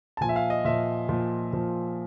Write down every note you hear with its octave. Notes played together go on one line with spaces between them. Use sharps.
A5
A#2 F3 G#5
E5
F5
D#5
A#2 F3 E5
A#2 F3
A#2 F3